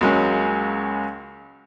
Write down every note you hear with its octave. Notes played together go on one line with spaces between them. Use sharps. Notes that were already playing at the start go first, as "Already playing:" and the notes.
C#2 F#3 G#3 A#3 C#4